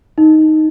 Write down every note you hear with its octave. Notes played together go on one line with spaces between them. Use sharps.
D#4